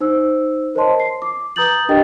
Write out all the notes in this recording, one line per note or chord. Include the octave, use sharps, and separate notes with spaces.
D#4 C5 E6
A#4 C5 C#5 D#5 A5 C6
C7
D6
B4 A#5 D#6 G6 A6 F#7
D4 G4 A#4 D#5 G5 A6